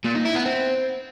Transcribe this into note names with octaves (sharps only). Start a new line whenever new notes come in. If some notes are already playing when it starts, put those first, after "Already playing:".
A#2
D#4
E4
B3
C4